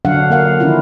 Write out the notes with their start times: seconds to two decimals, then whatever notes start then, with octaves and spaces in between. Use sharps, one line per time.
0.05 D3 F#3 D4 F5 F#5
0.30 A#3 A#4 F5 F#5
0.60 D#3 F3 C#4 D4 E4 F4